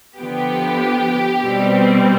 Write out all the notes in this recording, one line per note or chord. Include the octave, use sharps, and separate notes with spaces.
D3 F3 B3 G4
B2 G3 C4